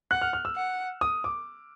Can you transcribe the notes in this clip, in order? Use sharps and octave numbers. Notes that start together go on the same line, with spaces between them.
F#5 F#6
F6
F6
E6
F#5
D#6
D6